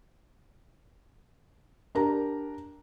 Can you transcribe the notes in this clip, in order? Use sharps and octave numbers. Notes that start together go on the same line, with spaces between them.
D4 G4 A#4 A#5